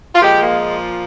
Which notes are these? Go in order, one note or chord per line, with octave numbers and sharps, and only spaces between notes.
F4
A#2 F3 G#3 G4
A#3